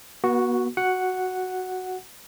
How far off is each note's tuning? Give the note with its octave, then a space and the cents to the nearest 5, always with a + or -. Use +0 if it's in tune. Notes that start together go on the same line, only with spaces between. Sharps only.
B3 -40 F#4 +0
F#4 +0 F#5 +0